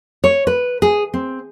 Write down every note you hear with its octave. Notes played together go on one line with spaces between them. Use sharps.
C#5
B4
G#4
C4